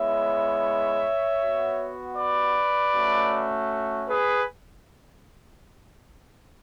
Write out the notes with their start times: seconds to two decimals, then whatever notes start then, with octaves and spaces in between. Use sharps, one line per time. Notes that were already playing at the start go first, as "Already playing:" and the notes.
Already playing: G#3 B3 E4 C#5 E5
1.40 B3 F#4
2.17 B4 D5
2.94 A3 C#4 F#4
4.09 G#4 B4